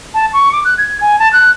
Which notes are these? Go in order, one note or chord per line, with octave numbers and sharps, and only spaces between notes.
A5
C#6
D6
F#6
G#6
G#5
A5
F#6